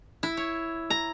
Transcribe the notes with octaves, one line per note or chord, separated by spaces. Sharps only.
E4
C#5
A#5